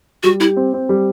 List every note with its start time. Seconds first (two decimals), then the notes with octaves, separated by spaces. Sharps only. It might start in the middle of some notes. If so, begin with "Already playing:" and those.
0.23 G3 F#4
0.40 E4 G4
0.57 C4
0.74 C4
0.89 G3